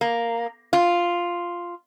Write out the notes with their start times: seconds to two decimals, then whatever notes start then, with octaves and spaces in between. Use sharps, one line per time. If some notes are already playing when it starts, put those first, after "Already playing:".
0.01 A#3
0.73 F4